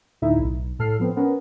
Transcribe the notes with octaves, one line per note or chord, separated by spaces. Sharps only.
D2 A2 D3 D#4 E4 E5
B1
A2 A4 F6 C7
F3 B3 C4
B3 C#4 A#4